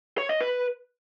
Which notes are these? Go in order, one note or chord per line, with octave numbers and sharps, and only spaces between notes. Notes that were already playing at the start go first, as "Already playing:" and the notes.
C#5
D#5
B4